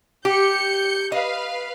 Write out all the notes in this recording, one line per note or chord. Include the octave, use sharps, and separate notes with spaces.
G4 G6 C#7
B4 D#5 F5